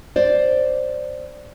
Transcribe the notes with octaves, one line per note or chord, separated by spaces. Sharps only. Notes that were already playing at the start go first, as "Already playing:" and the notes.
C5 D5